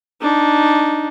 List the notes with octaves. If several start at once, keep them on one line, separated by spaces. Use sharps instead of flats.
D4 D#4